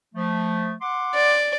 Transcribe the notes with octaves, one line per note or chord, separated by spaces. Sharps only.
F3 A3
F#5 C6 D6
D5